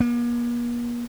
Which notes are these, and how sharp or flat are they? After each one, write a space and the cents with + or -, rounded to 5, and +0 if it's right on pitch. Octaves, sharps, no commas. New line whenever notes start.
A#3 +45